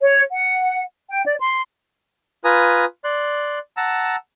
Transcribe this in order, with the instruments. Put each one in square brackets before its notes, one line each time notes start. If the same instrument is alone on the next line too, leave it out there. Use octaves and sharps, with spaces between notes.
[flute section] C#5
F#5
G5
D5
C6
[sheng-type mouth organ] F4 B4 G#5 A#5 D#6
D5 C6 F#6
F#5 A5 A#5 E6